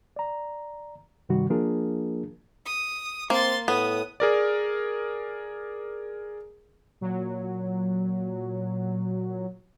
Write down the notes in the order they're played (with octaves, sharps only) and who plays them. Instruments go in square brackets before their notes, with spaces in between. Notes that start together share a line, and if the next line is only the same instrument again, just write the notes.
[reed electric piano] D5 A#5
G2 C3 D#3 G3 F#4
F3 A#3 D4 F4 G#4 A#4
[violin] D#6
[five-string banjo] A#3 [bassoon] C4 [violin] C6 A6
[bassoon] A2 [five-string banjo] B3 [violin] D#6
[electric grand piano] G#4 A#4 D5
[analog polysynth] A#2 F#3